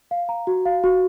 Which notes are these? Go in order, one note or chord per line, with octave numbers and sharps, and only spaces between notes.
F5
A#5
F#4
F5
F#4